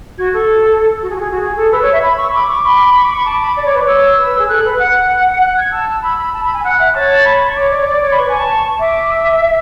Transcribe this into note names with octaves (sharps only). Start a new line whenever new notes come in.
F#4 G#6
A4
F#4
G#4
F#4
G#4
F#4
G#4
A4
B4 E6
C#5
E5
B5
C#6
B5 D6
C#6
B5
C#6
D6
B5 C#6
A5 D6
B5
D5
C#5
B4
C#5 E6
B4
G#4
A4 F#6
B4
F#5 F#6
F#6
G#6
A5 E6
B5 E6
B5
A5
B5
G#5
F#5 F#6
E5
C#5 A5
B5
C#6
C#5 D6
D5
C#5
D5
C#5
B5
B4 C#6
G#5
A5
C#6
E5 D6
E6